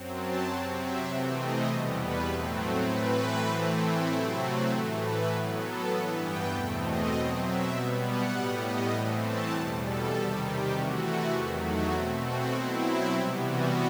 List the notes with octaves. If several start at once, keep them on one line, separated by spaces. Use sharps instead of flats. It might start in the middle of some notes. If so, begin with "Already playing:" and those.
Already playing: F#2 F#3 C4
A5
C3 F#3 C4 F#5
E5
C3 E3 A3 C4 F#5
D#5
E2 B2 G3 B3
B4
A2 F#3 A3 C4
A2 E3 A3 C4 B4
A2 E3 A3 C4 F#4
E4
C3 F#3 A3 C4 E4
F#4
A2 E3 A3 A4
B4
A2 F#3 B3
A4
G2 E3 B3 F#5
G5
E2 B2 A3 C4 A5
D#5
B2 F#3 C4 D#5
E5
B2 G3 B3
F#5
A2 G3 B3 F#5
D#5
A2 E3 A3 C4 B5
A5
E2 B2 G3 F#5
A4
C3 D#3 G3 A4
G4
C3 E3 A3 F#4
E2 D#3 F#3 A3 G4
F#4
B2 A3 C4 E4
F#4
B2 F#3 C4 E4
C3 E3 G3 B3
F#4